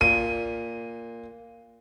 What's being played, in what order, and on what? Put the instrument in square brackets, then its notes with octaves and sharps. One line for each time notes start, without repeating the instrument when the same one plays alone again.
[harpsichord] A#2 [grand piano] D#7